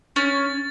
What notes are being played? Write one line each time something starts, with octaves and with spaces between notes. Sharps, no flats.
C#4 A6